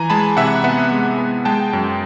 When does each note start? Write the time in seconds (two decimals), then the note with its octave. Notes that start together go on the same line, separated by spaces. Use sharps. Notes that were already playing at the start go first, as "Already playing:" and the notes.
Already playing: E3 G#5 A#5
0.10 G#3 A5 B5
0.37 C3 E5 F#5
0.64 B3 E5 F#5
0.92 G#3
1.18 B3
1.45 G#3 G5 A5
1.73 F#2